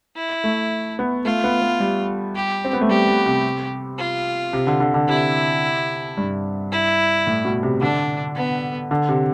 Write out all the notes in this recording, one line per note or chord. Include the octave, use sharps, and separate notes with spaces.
E4
A3
B3
A3 F4
B3
B3
G3
G4
C4
B3
A3
G3 G4
G3
C3
F4
C3
D3
D3
D3
C3 E4
G2
E4
A2
B2
C3
D3 D4
B3
D3
C3